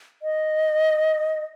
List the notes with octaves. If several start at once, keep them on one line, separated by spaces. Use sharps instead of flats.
D#5